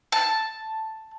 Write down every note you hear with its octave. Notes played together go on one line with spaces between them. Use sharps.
A5